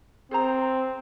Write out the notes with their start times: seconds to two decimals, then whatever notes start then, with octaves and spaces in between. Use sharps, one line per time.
0.31 C4 G#4 C5 A#5